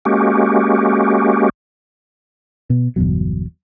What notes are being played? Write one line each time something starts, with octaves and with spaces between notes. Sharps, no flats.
G#3 A#3 C#4 F#4 G4
B2
G1 E2 B2 F#3